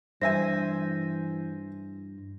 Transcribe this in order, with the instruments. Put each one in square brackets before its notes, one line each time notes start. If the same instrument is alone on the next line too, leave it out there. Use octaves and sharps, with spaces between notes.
[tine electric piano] G2 [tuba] E3 [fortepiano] C5 E5 G#5 [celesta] A#6